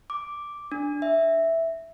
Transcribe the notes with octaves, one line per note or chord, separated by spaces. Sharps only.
D6
D4
E5